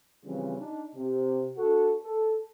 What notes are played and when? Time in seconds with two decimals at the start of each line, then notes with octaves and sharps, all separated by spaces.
0.25 C#3 E3 F3 G3 C4
0.59 D4 D#4
0.95 C3
1.57 D4 F#4 A4
2.04 A4